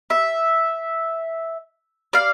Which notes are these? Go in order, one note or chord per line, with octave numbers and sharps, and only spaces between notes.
E5
D5 F5